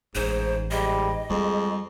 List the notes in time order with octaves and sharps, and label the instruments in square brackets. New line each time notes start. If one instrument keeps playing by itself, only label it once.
[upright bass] A1 [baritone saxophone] G#2 [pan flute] C5
[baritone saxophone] G#2 [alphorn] G3 [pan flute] D#5
[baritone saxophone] F2 [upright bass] G3 [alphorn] G#3